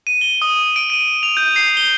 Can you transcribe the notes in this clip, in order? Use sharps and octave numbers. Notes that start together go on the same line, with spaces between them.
D#7
G7
D#6
D7
D#7
F7
G6
C7
G7